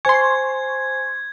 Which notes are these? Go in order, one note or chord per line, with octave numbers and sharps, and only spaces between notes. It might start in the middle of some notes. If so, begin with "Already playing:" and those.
C5 G#5 C6 C#6 G#6